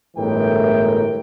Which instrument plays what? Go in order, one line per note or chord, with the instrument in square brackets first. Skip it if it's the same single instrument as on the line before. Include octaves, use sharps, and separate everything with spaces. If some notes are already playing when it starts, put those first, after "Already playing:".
[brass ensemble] G1 A2 E3 G#3 A#4 G5